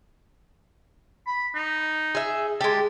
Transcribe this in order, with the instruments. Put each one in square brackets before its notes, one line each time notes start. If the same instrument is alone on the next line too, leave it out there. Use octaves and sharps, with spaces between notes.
[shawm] B5
D#4
[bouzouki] G#4 E5
[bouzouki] G#3 G4 [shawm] A5